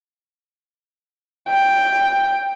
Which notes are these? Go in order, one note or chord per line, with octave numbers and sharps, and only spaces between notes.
G5